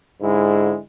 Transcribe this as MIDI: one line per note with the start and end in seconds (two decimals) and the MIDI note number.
0.22 0.74 44
0.22 0.80 50
0.22 0.80 56
0.22 0.80 64